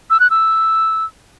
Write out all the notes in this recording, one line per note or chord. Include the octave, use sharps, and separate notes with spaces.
E6
F#6
E6